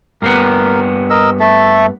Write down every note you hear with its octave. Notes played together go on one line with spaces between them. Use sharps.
G2 A#3 B3 A#4
A#4 D#5 E6
A3 A4 E5